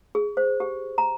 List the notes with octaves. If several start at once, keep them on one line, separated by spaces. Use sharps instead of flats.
G#4
C5
G4
A#5